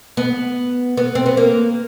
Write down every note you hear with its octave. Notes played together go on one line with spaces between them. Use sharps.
B3
B3
C4
B3
A#3